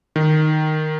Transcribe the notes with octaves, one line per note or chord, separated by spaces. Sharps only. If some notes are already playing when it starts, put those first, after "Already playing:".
D#3